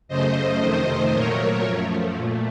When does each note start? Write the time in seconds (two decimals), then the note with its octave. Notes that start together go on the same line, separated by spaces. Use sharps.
0.08 F#2 C#3 A3 C5 D#5
0.60 F2 C3 D#3 A3 C5 D#5
1.12 A#2 F#3 A3 A#4 C#5
1.64 F#2 F3 A3
2.16 A#2 A3